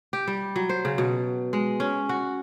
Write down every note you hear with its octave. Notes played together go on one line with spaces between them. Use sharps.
G4
G3
F#3
C5
C#3
B2
G#3
C#4
F#4